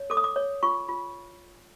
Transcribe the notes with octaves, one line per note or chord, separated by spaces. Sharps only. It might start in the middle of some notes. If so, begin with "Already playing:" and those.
Already playing: C#5
A4 D6
D#6
D6
C#5
F4 C#6
F4